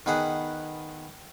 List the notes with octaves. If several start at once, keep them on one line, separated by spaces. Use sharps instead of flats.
D#3 B3 G#4 F#5